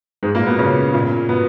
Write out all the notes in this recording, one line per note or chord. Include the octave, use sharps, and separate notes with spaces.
G#2 G#3
A#2 A#3
B2 B3
C#3 C#4
A#2 A#3
B2 B3